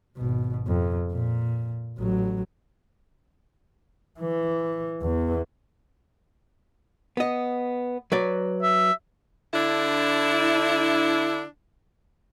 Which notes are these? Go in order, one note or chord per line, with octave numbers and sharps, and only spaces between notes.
G#1 B2
F2
A#2
A1 F#3
E3
E2
B3 D#5
F#3 B4 D5
E5
D3 D4 E4